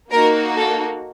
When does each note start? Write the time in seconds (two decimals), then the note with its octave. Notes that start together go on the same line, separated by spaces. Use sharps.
0.11 A#3 D#4 F#4 A#4
0.56 A4